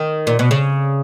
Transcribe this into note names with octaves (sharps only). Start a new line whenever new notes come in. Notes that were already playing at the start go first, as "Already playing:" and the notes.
Already playing: D#3
A#2
B2
C#3